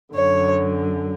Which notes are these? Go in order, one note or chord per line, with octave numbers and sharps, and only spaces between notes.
F#2 D3 C#5